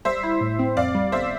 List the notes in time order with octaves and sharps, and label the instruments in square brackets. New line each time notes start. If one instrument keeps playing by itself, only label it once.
[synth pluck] G3 [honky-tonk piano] C5 E5
[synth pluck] E4
A2
C4
[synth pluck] F2 [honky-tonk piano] D5 F5
[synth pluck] G3
[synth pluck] G1 [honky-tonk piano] C5 E5